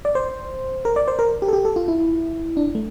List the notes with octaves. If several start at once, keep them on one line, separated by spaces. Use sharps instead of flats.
D5
C5
A#4
D5
C5
A#4
G4
A4
G4
A4
F4
E4
D4
A3